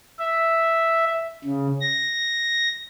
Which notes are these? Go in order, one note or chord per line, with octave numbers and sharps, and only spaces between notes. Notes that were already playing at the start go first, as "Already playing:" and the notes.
E5
C#3
A#6